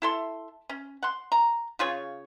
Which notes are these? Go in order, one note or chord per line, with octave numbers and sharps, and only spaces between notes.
E4 A4 C6
C#4
F#5 C6
A#5
C#3 F4 G#4 C#5